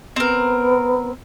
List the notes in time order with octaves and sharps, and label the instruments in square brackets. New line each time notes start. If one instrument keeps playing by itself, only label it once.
[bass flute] B3 [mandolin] C4 A#4